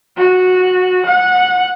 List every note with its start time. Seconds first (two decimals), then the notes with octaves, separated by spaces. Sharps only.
0.17 F#4
1.06 F#5